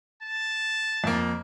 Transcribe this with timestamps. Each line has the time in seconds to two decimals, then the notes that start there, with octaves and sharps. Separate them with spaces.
0.22 A5
1.04 F2 A#3